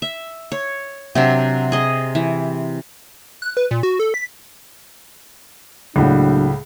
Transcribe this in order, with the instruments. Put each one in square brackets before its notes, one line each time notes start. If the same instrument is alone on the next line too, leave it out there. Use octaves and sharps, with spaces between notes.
[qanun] E5
C#5
C3 F#3 D4
G#4 D#5
E3
[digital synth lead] F#6
B4
A#2
F#4
A4
B6
[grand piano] C#2 A2 F#5 [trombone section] F#3 A#3 D4